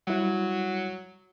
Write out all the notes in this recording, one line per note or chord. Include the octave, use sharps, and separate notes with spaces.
F#3 G3 E4